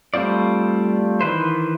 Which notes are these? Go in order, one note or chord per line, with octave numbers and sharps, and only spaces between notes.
G3 A3 C4 F4 D5
D#3 E3 B4 C5